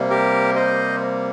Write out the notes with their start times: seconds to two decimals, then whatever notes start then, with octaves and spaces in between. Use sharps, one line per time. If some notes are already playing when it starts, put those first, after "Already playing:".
Already playing: C3 G3 A#3
0.10 G4 A#4
0.56 C5 D#5